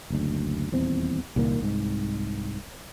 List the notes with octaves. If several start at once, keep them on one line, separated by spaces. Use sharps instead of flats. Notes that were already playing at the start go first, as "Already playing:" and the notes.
F#1 D2
D#1 E2 C4
C2 A#2 D#3 A#3
C2 G#2